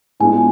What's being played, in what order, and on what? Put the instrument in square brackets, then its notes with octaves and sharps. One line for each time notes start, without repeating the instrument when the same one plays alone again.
[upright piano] A2 G#3 B3 D4 F4 [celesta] G#5